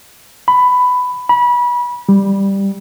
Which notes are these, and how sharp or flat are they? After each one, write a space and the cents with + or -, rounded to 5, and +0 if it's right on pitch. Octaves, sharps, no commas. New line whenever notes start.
B5 +15
B5 -25
G3 +5